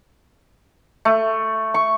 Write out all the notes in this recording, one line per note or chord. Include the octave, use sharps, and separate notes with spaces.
A3
C#6